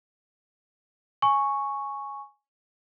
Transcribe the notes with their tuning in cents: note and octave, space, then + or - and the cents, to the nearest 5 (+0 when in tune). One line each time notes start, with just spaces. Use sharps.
G#5 +0 C#6 -5